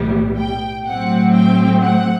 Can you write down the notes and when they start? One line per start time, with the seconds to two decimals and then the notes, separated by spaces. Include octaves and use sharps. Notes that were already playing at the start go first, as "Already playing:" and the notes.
Already playing: B1 A2 E3 G3 B3
0.38 G5
0.86 A2 F#3 C4 F#5
1.33 G5
1.80 F#5